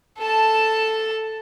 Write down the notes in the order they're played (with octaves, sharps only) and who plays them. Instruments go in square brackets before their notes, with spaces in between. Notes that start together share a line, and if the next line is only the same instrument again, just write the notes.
[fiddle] A4 A5